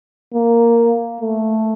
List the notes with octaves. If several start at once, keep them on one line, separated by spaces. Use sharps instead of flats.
A#3
A3